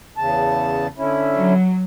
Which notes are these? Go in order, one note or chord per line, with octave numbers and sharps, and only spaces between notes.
E2 C#3 A5
D3 C#4 E4
F#3